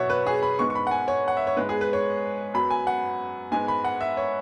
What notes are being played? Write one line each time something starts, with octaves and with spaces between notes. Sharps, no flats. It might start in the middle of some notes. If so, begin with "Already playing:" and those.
Already playing: E2 B2 F#3 C#5 E5 F#5
B4
G#4
B5
G#2 G#3 B3 C#6
C#6
B5
F#5
G#5
C#5
F#5
E5
C#5
G#2 G#3 B3 B4
G#4
B4
C#5
F#2 F#3 B3 B5
G#5
F#5
G#2 G#3 B3 G#5
B5
F#5
E5
C#5